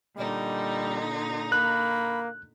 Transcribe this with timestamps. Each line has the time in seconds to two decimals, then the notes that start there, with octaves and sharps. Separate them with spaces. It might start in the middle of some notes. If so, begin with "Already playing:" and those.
0.17 A#2 D3 G3 D#4 D#5
1.52 A#3 B5 F#6